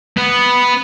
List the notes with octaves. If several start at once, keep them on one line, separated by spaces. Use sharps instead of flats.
B3